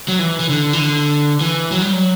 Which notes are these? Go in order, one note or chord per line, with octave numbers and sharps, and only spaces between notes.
F#3
E3
E3
D3
E3
D3
E3
F#3
G3
F#3